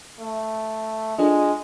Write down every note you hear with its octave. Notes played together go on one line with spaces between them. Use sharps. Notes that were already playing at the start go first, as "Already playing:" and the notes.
A3
G#3 D4 F4 A4